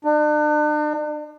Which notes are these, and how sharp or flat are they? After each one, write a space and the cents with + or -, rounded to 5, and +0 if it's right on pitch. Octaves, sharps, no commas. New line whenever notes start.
D4 +40